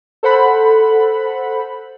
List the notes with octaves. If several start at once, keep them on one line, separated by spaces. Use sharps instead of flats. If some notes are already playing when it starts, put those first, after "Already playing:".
A4 C5 F#5 B5